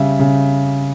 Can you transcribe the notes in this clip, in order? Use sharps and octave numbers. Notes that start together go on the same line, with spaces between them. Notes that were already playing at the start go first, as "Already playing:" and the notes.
Already playing: C#3 G3 E5
C#3